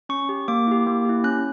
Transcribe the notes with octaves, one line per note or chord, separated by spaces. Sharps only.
C#4 C#6
G4
A#3 D6
E4 G4
A#3
E4 G4
C#4 F#6